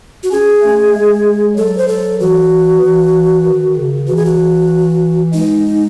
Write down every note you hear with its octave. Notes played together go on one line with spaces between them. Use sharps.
F#4
C#4 G#4
A3
G#3
F#3 A4
C5
A4
E3 F#4
E3
D#3
C#3
E3 F#4
G#4
F#4
G#3 D#4